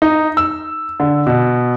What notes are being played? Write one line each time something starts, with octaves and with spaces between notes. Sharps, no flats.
D#4
E6
D3
B2